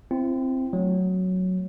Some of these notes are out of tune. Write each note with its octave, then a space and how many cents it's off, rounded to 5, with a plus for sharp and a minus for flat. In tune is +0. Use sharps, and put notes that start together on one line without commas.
C4 +0 E4 +45
F#3 +0 A3 -10